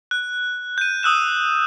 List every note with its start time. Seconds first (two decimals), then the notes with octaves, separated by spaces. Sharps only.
0.11 F#6
0.78 G6 D#7
1.03 D#6 E6 F#6 E7